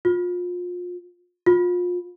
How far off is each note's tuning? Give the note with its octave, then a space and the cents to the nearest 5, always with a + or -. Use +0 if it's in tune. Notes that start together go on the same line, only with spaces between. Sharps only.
F4 +30
F4 +30